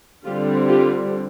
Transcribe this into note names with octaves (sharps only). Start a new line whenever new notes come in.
D3 G3 C4 F4 G4
F4 G4